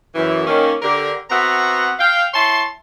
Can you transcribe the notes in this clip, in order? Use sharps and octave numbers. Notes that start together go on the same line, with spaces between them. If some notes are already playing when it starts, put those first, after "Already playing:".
F#2 E3
D#3 A#3 C#4
D3 G4 A#4
B3 C4 F#4 E5 F#5 A#5
F5 G5
E4 C#5 A5 C6